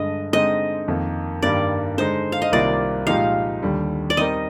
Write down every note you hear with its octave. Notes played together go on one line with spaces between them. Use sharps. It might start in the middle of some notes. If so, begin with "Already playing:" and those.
Already playing: G2 D3 G#3 D#5
D3 G#3 C4 D#4 D#5
F2 D#3 A#3
G2 D#3 G3 A#3 D5
D3 G#3 D#4 C5
F5
D#5
C2 C3 D#3 A#3 F4 D5
A#2 F3 G#3 D#4 G4 F5
D#2 D3 G3
D5
G3 C4 D#4 A#4 D#5